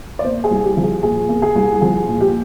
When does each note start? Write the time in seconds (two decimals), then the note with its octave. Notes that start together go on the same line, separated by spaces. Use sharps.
0.19 D5
0.25 A#3 C5
0.44 G#4
0.51 C2
0.64 G4
0.77 F3
0.84 G#4
1.03 A#2 G#4
1.29 A#3
1.42 G#4
1.55 C2
1.81 F3 G#4
2.08 A#2
2.21 G4